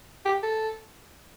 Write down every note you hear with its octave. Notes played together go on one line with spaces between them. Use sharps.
G4
A4